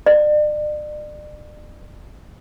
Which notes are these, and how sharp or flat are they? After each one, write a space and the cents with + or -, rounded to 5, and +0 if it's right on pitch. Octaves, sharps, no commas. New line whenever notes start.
D5 +35